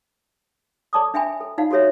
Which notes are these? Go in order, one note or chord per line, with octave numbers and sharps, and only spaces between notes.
A4 D5 A5 D6 D#6
D4 E5 G5 G#5 B5
A4
D#4 F4 D5 F5 F#5
F#4 G4 A4 C#5 E5